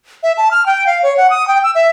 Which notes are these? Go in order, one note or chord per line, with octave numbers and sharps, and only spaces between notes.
E5
A5
F6
G5
F5
C#5
F#5
D#6
G5
E6
E5